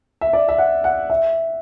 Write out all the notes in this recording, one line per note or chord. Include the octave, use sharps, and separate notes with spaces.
E5
D5
E5
F#5
F#5
E5